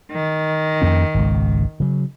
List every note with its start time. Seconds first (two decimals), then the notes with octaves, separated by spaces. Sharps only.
0.12 D#3
0.82 F2 A#3 C#4
1.14 G#1 C#2
1.80 C#3 F#3